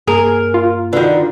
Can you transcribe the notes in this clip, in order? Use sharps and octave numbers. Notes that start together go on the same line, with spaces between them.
G2 A#3 G#4 A#4
F4
D3 D#3 F#4 B4